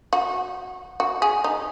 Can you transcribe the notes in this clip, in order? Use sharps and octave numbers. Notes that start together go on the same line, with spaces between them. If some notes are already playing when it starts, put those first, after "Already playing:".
F#4
F#4
G#4
D#4